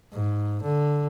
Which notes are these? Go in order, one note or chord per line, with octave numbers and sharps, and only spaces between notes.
G#2
D3